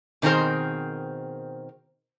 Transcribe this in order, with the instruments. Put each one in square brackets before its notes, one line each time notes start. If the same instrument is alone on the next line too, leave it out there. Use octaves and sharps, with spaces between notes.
[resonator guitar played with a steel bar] B2 D#3 C4 G#4 A#4 C5